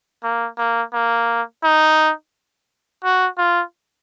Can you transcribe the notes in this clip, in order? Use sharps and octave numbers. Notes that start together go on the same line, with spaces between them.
A#3
A#3
A#3
D#4
F#4
F4